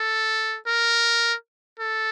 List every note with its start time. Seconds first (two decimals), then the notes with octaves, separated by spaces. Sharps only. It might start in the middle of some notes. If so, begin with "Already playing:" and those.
Already playing: A4
0.67 A#4
1.80 A4